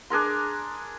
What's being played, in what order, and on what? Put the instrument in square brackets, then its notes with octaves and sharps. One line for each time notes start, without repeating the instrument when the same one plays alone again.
[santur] D4 G#4 A#4 C6